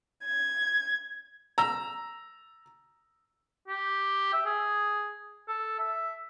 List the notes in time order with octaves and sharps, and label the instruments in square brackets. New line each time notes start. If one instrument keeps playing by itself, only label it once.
[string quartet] G#6
[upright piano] A#5 E6
[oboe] G4
E5
G#4
A4
E5